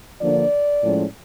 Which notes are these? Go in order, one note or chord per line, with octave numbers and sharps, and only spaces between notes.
D3 F3 A#3 D4 D5
A2 F3 G#3 C#4